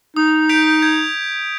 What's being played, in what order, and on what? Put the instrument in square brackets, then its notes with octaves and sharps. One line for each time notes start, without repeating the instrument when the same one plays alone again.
[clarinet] D#4 [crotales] D#6
[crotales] G6 B6 D7 F7
G#6